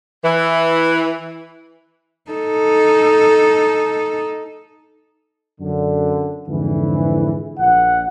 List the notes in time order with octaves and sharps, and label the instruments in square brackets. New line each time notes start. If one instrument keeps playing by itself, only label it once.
[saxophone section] E3
[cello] D#4 A4
[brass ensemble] F#2 D3
F2 G#2 D3 E3
A#1 F#5